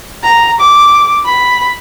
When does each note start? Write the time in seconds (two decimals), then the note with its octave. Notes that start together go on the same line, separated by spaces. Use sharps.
0.24 A#5
0.60 D6
1.25 B5